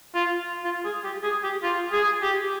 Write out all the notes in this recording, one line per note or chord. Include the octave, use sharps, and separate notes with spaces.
F4
F4
G#4
G4
G#4
G4
F4
G#4
G4